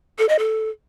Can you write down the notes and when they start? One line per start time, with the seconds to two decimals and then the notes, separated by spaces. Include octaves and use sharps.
0.19 A4
0.29 D#5
0.39 A4